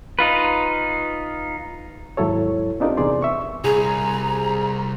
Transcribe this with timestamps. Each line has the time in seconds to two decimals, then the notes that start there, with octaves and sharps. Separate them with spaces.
0.19 D#4 F4 B4
2.17 D#2 G#2 F#3 E4 A4 C#5
2.80 C4 D4 D#4 F4 G4 A#4
2.97 E2 C3 B3 G#4 D5 C6
3.22 E5 C#6
3.64 C2 G#4 A#5